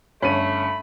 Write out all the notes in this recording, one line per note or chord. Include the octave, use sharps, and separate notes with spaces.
G1 A3 C#4 B5 D#7